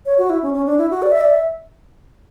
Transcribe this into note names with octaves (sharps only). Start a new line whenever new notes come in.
C#5
F#4
E4
C#4
C#4
D4
E4
F#4
D5
E5
D5
E5